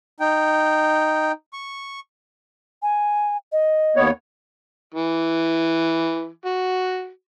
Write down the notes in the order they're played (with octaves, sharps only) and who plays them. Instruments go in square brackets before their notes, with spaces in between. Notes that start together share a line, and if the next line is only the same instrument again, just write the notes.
[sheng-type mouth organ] D#4 G5
C#6
[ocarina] G#5
D#5
[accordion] D#2 B3 C#5
[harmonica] E3
F#4